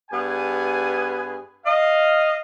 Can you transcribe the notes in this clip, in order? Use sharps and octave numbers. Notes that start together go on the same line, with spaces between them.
G2 B3 G#4 B4 G#5
D#5 F5